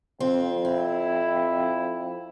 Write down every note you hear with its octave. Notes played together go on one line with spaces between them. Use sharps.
F2 C4
C4 E4